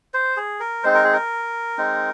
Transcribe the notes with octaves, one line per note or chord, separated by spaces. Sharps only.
C5
G#4
A#4
G#3 C4 D#4 C5
A#4
G#4
A#4
G#3 C4 D#4